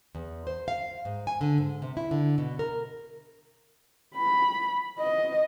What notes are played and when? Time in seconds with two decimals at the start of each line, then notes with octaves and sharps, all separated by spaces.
0.15 E2
0.47 C5
0.68 F5
1.05 G#2
1.27 G#5
1.41 D3
1.58 G#2
1.82 C3
1.97 E4
2.11 D3
2.38 B2
2.59 A#4
4.15 B5
4.99 D#5